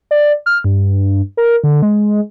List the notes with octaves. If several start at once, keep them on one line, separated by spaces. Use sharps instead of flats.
D5
F6
G2
A#4
D3
G#3